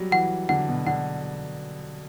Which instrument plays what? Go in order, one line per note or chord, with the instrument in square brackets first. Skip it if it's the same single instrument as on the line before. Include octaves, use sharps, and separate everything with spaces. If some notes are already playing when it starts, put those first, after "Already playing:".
Already playing: [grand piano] F#3 G3
[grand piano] E3 [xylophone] F#5
[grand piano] D3 [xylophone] F#5
[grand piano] B2
[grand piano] D3 [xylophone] F#5